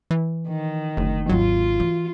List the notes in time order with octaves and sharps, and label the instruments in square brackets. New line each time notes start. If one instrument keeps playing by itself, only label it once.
[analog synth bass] E3
[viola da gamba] D#3
[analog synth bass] F#1 [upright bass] D2
[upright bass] G#1 D#2 [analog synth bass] F#3 [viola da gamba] F4
[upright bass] E3